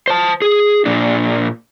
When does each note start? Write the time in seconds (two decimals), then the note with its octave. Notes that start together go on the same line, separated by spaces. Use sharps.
0.08 C5 A5
0.42 G#4
0.86 A#2 D4